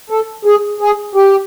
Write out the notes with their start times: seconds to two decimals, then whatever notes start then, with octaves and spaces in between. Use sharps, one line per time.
0.10 A4
0.45 G#4
0.81 G#4
1.15 G4